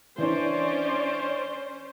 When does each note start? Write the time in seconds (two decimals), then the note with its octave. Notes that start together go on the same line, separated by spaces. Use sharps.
0.18 E3 C#4 D4 C5 D5